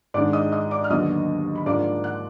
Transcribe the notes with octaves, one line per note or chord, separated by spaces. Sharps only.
G#2 D#3 G#3 D4 D5 D6
D#5 D#6
D#5 D#6
D5 D6
F6
D#2 D3 F#3 B3 D#5 D#6
B5
G#2 F3 A#3 D4 D5 D6
F#5 F#6